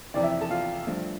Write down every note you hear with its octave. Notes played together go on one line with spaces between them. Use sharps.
F2 C3 E3 D5
E4 E5
A4 A5
F4 F5
G2 F3 A3